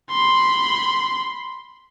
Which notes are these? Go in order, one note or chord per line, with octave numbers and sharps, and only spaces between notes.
B5 C6